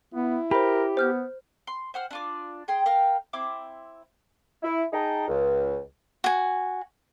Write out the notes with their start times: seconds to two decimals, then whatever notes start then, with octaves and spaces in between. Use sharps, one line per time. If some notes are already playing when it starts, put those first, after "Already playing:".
0.14 B3 E4
0.51 G4 A#4 C5 B5
0.97 B3 C5 F6 G6
1.67 C6
1.94 C5 F#5 F6
2.11 D4 F4 D6
2.68 G#4 G5 C6
2.86 A#4 F5 G5
3.33 C4 E4 C6 D6
4.63 E4
4.93 D#4 G#4 G5 A5 A#5
5.27 C#2
6.24 F#4 G#5